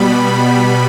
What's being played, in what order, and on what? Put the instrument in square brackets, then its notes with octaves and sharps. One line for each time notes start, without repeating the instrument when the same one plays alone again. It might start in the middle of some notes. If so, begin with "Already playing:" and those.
Already playing: [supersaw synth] B2 G3 B3 B5